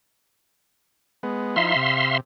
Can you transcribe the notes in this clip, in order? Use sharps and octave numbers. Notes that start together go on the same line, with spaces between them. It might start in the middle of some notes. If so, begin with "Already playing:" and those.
G#3 B3
F3 D#4 E4 E5 F5 C6
C3